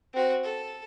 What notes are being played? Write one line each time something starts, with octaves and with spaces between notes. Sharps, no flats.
C4 F#4
A4